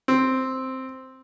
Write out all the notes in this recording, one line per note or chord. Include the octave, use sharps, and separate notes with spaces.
C4